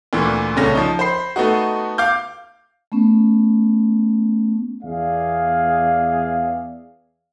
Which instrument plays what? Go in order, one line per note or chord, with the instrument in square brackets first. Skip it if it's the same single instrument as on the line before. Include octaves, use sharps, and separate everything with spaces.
[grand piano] D2 A#2 E3
C2 C#3 A3 C#4 A#6
F3 D#4
C5 B5 C7
A3 B3 D#4 F#4
F5 D6 F6 G6
[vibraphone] A3 B3 C#4
[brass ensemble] E2 B3 G#4 D5 E5 F5